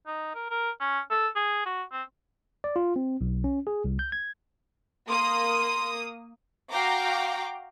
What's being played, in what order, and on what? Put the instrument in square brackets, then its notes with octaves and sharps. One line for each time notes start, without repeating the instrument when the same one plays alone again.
[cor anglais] D#4
A#4
A#4
C#4
A4
G#4
F#4
C4
[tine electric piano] D5
F4
C4
B1
C#4
G#4
C2
G6
G#6
[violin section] A#3 D#6 [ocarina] C6
[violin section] F#4 F5 G5 A#5 D6